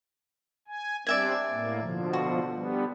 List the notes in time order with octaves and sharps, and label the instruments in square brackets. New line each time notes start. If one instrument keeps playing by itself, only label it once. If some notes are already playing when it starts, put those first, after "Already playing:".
[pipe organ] G#5
[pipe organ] G3 C4 D4 [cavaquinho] D5 E5 G#5
[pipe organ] A2 A#3
B2 D3 F3
[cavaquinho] F#4
[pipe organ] D3 G3 B3